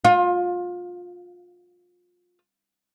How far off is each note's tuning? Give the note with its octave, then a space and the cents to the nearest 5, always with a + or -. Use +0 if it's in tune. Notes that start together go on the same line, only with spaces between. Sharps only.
F4 +25